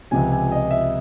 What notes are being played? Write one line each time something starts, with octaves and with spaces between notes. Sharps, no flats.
C#2 C3 F3 G#5
G#5
D#5
E5